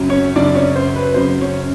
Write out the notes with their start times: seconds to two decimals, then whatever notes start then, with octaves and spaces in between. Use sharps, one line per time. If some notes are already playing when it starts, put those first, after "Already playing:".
Already playing: F#2 C#3 F#3
0.09 C#4 C#5
0.36 F#2 C#3 F#3 D4 D5
0.55 C#4 C#5
0.75 C5
0.96 B4
1.14 F#2 C#3 F#3 C5
1.41 C#4 C#5